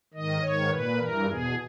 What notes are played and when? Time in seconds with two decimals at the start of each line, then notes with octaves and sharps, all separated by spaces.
0.14 G#2 D#3 D#5
0.41 G#2 D#3 C#5
0.70 A#2 B4
0.98 G2 E3 A#4
1.26 E2 B2 G#4